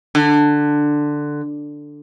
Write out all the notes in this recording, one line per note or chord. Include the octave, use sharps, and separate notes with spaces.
D3